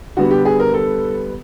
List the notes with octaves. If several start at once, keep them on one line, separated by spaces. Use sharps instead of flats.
D3 G3 B3 F#4
G4
G#4
A#4
A4